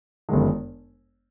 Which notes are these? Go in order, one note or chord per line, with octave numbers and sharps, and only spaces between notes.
G1 F#2 D#3 G#3